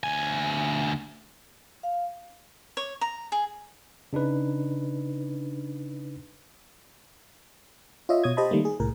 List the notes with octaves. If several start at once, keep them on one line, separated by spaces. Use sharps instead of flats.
D2 G#5
F5
C#5
A#5
G#4
C#3 D4 D#4 B4
F4 C#5 D#5 E5
B2 C#5 D#6 G#6
G4 C5 D#5 A5 B5
D#3 G3 A3 A#3
G#4
C2 A2 A#4